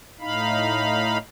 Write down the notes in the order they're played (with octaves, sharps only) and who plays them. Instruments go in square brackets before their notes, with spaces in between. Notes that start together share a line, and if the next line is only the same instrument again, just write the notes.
[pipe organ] A2 D#4 F5 B5